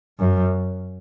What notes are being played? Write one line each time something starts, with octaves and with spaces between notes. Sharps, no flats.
F#2